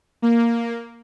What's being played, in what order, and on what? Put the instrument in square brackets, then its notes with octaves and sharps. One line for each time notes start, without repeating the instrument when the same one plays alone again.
[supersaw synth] A#3